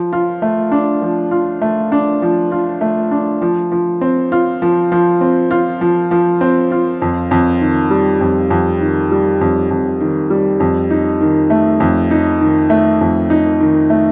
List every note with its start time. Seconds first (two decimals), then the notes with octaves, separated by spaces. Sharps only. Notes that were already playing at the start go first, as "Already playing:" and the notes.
Already playing: F3
0.13 F4
0.42 A3
0.72 D4
1.02 F3
1.31 F4
1.61 A3
1.92 D4
2.22 F3
2.52 F4
2.81 A3
3.11 D4
3.42 F3
3.72 F3
4.01 C4
4.32 F4
4.62 F3
4.92 F3
5.21 C4
5.51 F4
5.81 F3
6.11 F3
6.41 C4
6.72 F4
7.02 F2
7.31 F2
7.61 D#3
7.90 G3
8.21 F2
8.50 F2
8.81 D#3
9.11 G3
9.41 F2
9.70 F2
10.00 D#3
10.30 G3
10.60 F2
10.91 D#4
11.21 D#3
11.50 A3
11.80 F2
12.11 D#4
12.41 D#3
12.70 A3
13.01 F2
13.30 D#4
13.61 D#3
13.90 A3